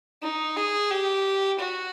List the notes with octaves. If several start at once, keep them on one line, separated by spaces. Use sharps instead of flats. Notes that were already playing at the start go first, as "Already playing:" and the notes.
D#4
G#4
G4
F#4